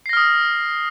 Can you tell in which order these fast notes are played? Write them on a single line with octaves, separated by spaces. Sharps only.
C7 A#6 F6 D#6